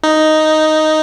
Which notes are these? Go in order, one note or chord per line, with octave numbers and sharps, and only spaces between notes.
D#4